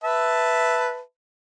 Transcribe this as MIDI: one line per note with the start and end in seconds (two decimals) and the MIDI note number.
0.04 1.00 71
0.04 1.00 76
0.04 1.00 81